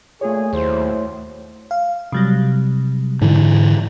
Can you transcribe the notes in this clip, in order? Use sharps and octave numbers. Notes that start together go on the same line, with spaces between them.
A#2 A3 G#4 C#5
D#2 F#3 E4 C5
F5
C3 F#3 G3
G#2 D3 E3